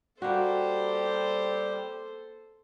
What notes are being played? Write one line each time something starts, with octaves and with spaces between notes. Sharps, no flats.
G3 A#3 F#4 G4 A4 C5